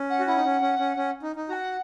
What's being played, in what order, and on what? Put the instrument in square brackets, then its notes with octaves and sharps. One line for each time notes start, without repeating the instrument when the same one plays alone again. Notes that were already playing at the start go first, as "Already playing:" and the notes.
Already playing: [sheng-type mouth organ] C#4
[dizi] F#5
[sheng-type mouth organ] F#4
[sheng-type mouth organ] E4 [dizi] F#5
[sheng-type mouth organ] D#4
C#4
C#4
C#4
C#4
D#4
D#4
[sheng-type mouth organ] F#4 [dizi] F#5 A#5